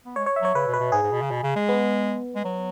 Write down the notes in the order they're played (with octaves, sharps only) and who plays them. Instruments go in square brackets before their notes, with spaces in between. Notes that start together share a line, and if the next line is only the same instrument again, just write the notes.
[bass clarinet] B3
[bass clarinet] G#3 [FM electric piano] C#5
[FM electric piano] C#5
E5
[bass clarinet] F#3 [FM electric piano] C#5
[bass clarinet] C#3 [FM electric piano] B4
[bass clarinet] B2
[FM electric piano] B4
[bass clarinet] B2
[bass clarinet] G#2 [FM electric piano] G#4
[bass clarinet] G#2
B2
C#3
B2
C#3
G#3
[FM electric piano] B3
[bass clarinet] G#3
F#3